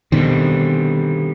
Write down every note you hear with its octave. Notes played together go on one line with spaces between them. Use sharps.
B2 D3 D#3 G3 C4